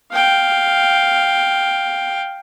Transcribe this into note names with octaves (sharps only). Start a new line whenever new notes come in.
F5 G5